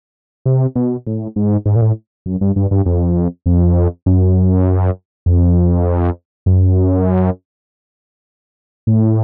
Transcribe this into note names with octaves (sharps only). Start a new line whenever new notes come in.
C3
B2
A2
G#2
G#2
A#2
A2
F#2
G2
G2
G2
F2
F2
F#2
F2
F#2
A2